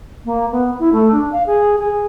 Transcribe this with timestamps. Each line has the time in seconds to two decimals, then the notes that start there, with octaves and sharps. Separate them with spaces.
0.25 A#3
0.51 B3
0.79 E4
0.92 A3
1.12 D4
1.32 F5
1.46 G#4
1.78 G#4